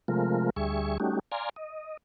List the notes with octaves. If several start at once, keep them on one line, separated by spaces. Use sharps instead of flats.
C3 F3 G#3 A3 F4 A#4
D2 G3 G#4 E5 C#6
G3 A3 C#4 D#4 F#4 G4
D5 F5 G#5 A#5 C6
D#5